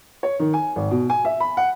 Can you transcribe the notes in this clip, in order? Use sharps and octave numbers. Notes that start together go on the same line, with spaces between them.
C#5
D#3
G#5
G#1
B2
G#5
E5
B5
F#5